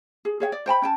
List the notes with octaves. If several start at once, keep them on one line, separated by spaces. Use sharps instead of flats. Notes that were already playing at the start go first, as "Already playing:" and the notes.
G#4
G#4 C#5 F5 G5
D5
C5 G5 A5 B5
C#4 G5 A5